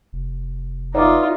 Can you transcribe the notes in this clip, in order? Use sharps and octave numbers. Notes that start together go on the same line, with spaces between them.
F1
D#4 F4 B4 D5 E5 F#5 A#5 D6